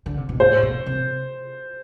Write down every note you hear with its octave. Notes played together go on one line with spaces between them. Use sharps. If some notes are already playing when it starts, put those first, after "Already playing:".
D3
C3
B2
A2 C5
B2
C3